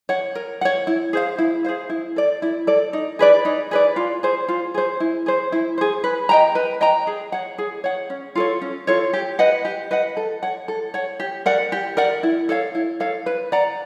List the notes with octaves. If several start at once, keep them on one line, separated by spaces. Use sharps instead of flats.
C#5 F#5
A#4
C#5 F#5
E4
G#4 C5 F5
E4
G#4 C5 F5
E4
A4 D5
E4
A4 D5
D#4
G#4 B4 D5
D#4
G#4 B4 D5
F4
G#4 C5
F4
G#4 C5
E4
G#4 C5
E4
G#4 C5
B4
D#5 G5 A#5
B4
D#5 G5 A#5
G#4
C#5 F#5
G#4
C#5 F#5
C#4
F4 A4 C#5
C#4
F4 A4 C#5
G4
B4 D#5 F#5
G4
B4 D#5 F#5
A4
C#5 F#5
A4
C#5 F#5
G4
A#4 D5 F#5
G4
A#4 D5 F#5
E4
A4 C#5 F5
E4
A4 C#5 F5
B4
D5 F#5 A#5